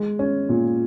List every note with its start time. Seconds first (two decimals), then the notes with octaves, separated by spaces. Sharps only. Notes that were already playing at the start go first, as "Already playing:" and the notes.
Already playing: G#3
0.19 C#4
0.49 A#2